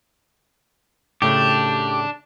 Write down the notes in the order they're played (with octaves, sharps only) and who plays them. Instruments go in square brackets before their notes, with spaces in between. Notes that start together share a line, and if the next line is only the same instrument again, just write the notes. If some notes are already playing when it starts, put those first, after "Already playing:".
[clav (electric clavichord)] A2 C#3 A3 [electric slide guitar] D4 [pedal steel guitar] G4